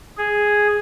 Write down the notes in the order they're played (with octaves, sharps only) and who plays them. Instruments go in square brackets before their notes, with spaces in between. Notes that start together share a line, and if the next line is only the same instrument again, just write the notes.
[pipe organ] G#4